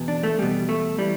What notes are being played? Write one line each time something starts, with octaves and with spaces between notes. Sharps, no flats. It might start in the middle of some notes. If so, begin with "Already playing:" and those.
Already playing: E2 B2
D4
A3
E2 B2 G3
A3
E3 G3